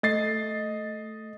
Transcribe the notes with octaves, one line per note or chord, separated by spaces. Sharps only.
A3 D#5 A6 C7